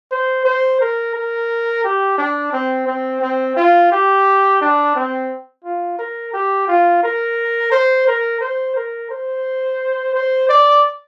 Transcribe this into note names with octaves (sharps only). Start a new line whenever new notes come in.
C5
C5
A#4
A#4
G4
D4
C4
C4
C4
F4
G4
D4
C4
F4
A#4
G4
F4
A#4
C5
A#4
C5
A#4
C5
C5
D5